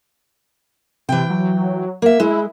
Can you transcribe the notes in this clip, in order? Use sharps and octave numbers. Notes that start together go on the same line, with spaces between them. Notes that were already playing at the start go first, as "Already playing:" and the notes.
C3 E3 G5
F#3
A#3 E5
G#3 E4